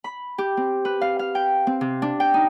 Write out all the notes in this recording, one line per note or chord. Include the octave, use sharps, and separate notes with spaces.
B5
G4
C4
B4
F5
F5
G5
C4
C3
D4
G5
D#4